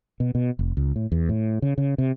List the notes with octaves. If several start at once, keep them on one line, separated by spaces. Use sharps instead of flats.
B2
B2
F1
C#2
A2
E2
A2
C#3
C#3
C3